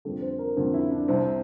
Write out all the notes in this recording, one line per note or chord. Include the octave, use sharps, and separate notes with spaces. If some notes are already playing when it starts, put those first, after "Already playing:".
F2 D3 G3 A4
C5
A#4
F2 D3 G3
E4
D4
C2 C3 G3 C4